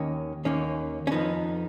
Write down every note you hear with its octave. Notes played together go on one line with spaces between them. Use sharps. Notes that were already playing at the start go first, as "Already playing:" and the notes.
Already playing: D#2 D#3 A#3 C#4
D#2 D#3 A#3 C#4
C#4
F2 F3 B3 D#4